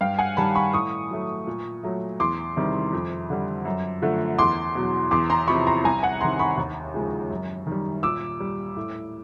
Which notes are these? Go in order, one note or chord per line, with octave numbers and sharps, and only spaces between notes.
G2 F5 G5
F#5 G#5
D#3 G3 A5 B5
B5 C#6
A2 C#6 D#6
F#3 A3
A#2
F#3 A3
E2 C6 D6
C3 D#3 G3
F2
D3 G3
F#2
D3 F3 A3
E2 C6 D6
B2 F#3
E2 C6 D6
A#5 C6
C3 F3 B5 C#6
A#5 C6
C2 G#5 A#5
F#5 G#5
C3 D#3 A#5 C6
B5 C#6
D#2
C#3 F3 G#3
F#2
D#3
G3
A#2 D6 E6
G3
A2